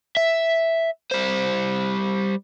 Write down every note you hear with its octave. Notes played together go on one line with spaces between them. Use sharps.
E5
G3 C5